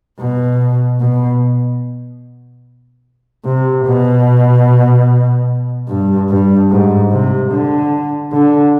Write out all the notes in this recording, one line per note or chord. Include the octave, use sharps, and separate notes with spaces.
B2
B2
C3
B2
G2
G2
G#2
C3
D3
D3